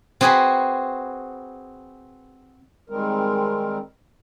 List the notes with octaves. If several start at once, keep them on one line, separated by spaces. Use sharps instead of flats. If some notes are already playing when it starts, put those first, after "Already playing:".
C4 F#4 G#4 B4 G#5 B5
D#3 G3 G#3 C4 A#4